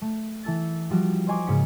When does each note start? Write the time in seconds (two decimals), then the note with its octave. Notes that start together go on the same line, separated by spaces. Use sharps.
0.02 A3
0.43 E3 A4 E6 A6
0.90 F3 G3 F#4
1.27 C5 C#5 D#5 G#5 C#6 D6
1.47 G#2 C#3 A#3 B6 C#7